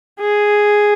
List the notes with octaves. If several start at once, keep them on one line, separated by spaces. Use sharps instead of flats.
G#4